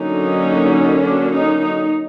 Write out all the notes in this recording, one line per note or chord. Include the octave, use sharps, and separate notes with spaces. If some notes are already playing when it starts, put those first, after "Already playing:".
Already playing: D3 F#3 A#3 C#4 D#4
D4
D#4
D#4